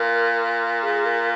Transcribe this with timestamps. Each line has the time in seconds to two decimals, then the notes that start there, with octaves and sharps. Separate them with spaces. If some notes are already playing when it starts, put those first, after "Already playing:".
Already playing: A#2 A#4
0.83 G#4
1.06 A#4